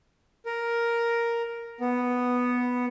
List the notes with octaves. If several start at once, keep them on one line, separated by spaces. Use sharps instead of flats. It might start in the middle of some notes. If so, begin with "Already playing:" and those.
A#4
B3